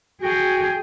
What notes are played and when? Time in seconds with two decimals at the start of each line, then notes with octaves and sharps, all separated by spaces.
0.22 F#4 G#4 G5